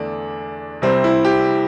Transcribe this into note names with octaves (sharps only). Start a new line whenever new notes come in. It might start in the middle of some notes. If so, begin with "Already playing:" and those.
Already playing: E2 D3 A3 D4
C2 C3 G3 C4
E4
G4